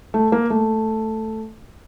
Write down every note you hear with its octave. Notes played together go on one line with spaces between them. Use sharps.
A3
A#3
A3